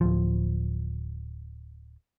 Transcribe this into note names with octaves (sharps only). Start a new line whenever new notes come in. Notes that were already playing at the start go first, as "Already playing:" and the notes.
D1 F3